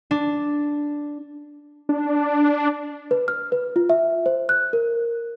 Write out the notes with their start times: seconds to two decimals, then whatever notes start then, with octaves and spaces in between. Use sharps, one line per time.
0.11 D4
1.89 D4
3.11 B4
3.28 F6
3.52 B4
3.76 F4
3.90 E5
4.26 C5
4.49 F#6
4.73 A#4